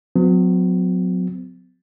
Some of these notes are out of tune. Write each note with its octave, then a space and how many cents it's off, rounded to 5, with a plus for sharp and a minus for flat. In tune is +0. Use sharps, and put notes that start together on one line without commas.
F#3 -30 B3 +45